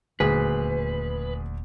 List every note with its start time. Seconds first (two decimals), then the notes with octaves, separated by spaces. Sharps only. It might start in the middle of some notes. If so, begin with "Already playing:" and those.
0.20 D#1 D2 G#4 B4